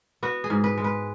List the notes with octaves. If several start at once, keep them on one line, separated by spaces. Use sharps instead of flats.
B3 F#4
G#4
G#2
B4
G#3
B4